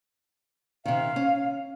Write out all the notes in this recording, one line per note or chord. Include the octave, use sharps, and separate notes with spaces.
C3 D#3 F5
C#4